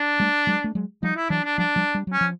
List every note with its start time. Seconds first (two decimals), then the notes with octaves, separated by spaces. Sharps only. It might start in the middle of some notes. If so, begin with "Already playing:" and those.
Already playing: D4
0.20 G3 A3
0.47 F#3 G#3
0.64 A3
0.75 F#3 G#3
1.03 F3 G3 D#4
1.17 E4
1.30 E3 F#3 D4
1.44 D4
1.58 F3 G3 D4
1.76 F3 G3
1.95 G3
2.07 F#3
2.13 C#4
2.21 F3